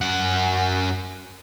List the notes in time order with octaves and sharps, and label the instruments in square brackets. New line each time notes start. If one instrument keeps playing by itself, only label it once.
[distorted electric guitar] F#2 F#5